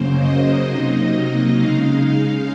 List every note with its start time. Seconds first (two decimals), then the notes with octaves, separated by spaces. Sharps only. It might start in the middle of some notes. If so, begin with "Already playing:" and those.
Already playing: F#2 C#3 F#3 A#3 C5
0.19 D#5
0.64 C3 F#3 A#3 D#4
1.56 C#3 G#3 D#4 F5
2.01 F5